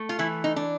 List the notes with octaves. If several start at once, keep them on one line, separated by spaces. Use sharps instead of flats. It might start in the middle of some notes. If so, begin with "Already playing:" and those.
Already playing: A3
F4
E3 E4
D#4
D4